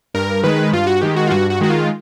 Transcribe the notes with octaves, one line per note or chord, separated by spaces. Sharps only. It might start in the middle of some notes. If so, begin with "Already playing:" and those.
G2 A#4
D#3 G#3 B4
G2 F4
F#4
D#3 G#3 G4
F#4
F4
G2 F#4
F#4
D#3 G#3 F#4
F4